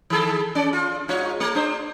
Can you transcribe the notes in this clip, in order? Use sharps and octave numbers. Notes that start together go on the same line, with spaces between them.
D#3 G#4 A4
C#4 D5
F4
G#2 F4 C#5
A3
D4 C5